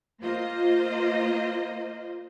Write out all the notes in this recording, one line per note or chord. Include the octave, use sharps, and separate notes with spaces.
A#3 F4 C5 D#5